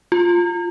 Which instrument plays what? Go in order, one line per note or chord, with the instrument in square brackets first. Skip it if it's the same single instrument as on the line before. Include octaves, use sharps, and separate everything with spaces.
[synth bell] F4